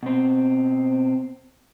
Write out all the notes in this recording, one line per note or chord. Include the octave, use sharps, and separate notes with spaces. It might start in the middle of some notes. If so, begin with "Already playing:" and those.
B2 C4